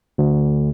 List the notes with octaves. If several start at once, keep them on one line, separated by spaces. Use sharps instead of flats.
D2